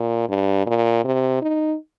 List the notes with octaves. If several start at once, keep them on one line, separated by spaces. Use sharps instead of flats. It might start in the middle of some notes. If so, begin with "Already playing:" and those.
Already playing: A#2
G2
A#2
C3
D#4